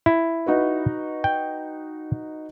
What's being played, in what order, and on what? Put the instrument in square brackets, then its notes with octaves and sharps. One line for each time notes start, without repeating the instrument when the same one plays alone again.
[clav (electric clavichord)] E4
[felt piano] D#4 F#4 B4
[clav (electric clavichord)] G5